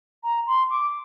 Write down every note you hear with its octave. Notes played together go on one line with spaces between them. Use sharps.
A#5
C6
D6